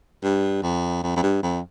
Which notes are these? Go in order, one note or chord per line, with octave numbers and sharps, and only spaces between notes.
G2
F2
F2
F2
G2
F2